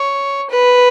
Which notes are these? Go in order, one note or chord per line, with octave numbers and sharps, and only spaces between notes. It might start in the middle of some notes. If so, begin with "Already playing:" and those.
Already playing: C#5
B4